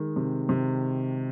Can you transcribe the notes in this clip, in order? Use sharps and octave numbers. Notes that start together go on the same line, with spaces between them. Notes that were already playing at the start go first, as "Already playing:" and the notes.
Already playing: D#3 G#3
C3
C3